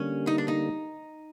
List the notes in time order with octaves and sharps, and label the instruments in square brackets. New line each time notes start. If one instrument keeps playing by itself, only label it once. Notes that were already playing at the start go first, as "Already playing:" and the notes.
Already playing: [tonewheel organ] D3 G3 A#3 [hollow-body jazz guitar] C#4
[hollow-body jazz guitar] D#4
D4
D#4